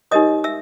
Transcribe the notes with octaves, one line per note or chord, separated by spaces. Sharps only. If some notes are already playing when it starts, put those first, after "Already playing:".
D#4 G4 A#4 C#5 D#5 D#6
E5 E6